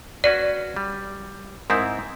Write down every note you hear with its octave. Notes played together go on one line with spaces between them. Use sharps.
C#4 F#4 B4 D5
G3
G#2 C4 E4 A#4 D#6 G6